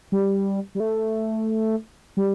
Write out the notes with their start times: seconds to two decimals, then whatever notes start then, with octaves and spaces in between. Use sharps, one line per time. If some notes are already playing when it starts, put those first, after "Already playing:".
0.12 G3
0.75 G3
0.80 A3
2.17 G3